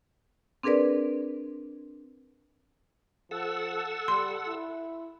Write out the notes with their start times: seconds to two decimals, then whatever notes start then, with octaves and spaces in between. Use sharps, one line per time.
0.63 C4 D4 G#4 A#4 B4 D5
3.31 F3 A4 F#5 E6
4.08 G3 C6
4.47 E4